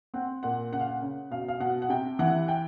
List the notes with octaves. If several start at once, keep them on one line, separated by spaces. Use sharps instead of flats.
C4 F#5
A#2 F#5
C#3 F#5
F5
F#5
C#3
B2 F5
F5
B2 F#5
F#5
C3 G5
E3 F#5
G5